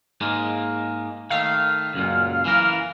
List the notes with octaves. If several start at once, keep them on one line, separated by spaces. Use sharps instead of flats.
G#2 G#3 A#3
D#3 A3 F5
C#2 F#2 A#2
E3 A#4